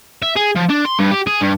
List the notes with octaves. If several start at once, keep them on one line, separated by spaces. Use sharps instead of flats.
E5
G#4
F3
D4
C6
G2
G4
G#4
G2